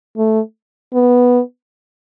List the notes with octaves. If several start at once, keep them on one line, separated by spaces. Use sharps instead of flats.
A3
B3